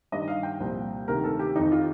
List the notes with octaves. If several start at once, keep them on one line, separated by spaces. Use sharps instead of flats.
G2 D#3 D#5
F5
G5
C2 A#2 F3
D2 C3 D#3 A#4
A4
G4
F2 D#3 D#4
F4